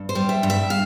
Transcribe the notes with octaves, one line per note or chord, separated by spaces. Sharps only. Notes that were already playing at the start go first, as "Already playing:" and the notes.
Already playing: G2
C5
G3
E5
G2
E5
F5